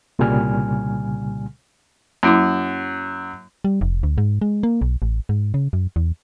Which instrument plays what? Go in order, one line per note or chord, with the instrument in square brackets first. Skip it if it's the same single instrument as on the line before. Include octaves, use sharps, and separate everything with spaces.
[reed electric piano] C2 A#2 C#3 G3 G#5 F6
[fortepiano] F#2 [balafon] A#3 E4 C6
[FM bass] G3
F1
D2
G#2
G#3
A#3
B1
A1
G#2
C#3
F#2
E2